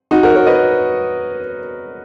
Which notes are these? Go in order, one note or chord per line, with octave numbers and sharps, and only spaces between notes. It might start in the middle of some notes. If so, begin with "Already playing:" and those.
D#4 F#4
F#4 A#4
A#4 C#5
B4 D#5